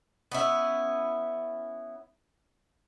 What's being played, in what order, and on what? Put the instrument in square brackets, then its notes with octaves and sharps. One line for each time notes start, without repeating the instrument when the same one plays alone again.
[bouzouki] B3 C#4 E4